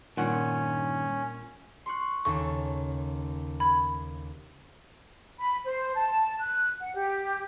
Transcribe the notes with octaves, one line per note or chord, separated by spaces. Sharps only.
G2 A#2 D#3 C#4 F#5
C6 C#6 F#6
D#2 C#3 A4 C#6
B5 G#6
B5
C5
A5
F#6
F#5
G4